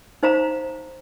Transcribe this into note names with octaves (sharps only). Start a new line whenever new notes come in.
D#4 C5 F5 A#5